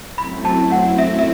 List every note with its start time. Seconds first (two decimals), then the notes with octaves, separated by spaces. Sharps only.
0.17 F#2 F#3 A3 C4 E4 B5
0.45 A5
0.72 F#5
0.98 E5
1.19 E5